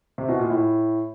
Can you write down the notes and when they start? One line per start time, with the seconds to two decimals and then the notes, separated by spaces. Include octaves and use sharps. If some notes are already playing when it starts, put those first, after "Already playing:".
0.18 C3
0.29 B2
0.39 A#2
0.50 A2